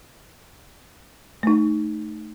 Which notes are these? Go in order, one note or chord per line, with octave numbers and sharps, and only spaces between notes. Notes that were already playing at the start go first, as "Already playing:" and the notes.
A3 D#4